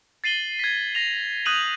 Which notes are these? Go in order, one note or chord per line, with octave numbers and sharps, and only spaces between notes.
A6 C7 D#7 F#7 G7
G#6 B6
A#6 F7
D#6 F#6 G6 D#7 F7 F#7